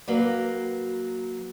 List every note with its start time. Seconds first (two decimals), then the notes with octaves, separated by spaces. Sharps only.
0.08 F#3 A#3 F#4 B4 D5